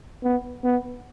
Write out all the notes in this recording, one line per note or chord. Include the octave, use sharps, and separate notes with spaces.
B3
B3